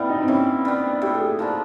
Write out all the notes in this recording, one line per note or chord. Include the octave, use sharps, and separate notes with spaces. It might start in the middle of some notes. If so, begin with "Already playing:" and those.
Already playing: E3 G3 B3 C4 E4
D#4
C4
E3 C#4
G3 B3 D4
A2 G4
G#4
F3 A#3 D4 A4